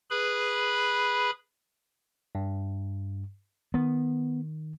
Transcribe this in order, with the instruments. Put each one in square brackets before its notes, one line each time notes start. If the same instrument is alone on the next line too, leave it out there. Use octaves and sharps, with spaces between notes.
[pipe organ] G#4 B4 B5
[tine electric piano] G2
[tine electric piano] D#3 [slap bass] B3